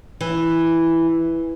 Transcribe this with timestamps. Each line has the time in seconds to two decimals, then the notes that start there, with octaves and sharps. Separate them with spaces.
0.21 E3